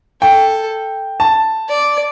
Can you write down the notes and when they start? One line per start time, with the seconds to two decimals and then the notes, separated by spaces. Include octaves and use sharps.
0.21 A4 G5
1.20 A5
1.69 D5